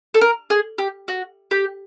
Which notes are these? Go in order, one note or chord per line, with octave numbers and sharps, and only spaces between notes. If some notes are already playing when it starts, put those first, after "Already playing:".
A4
A#4
G#4
G4
F#4
G4